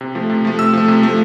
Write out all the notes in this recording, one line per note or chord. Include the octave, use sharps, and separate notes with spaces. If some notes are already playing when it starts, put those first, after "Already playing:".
C3
F3 A3
C3
F3 A3
C3 E6
F3 A3
C3
F3 A3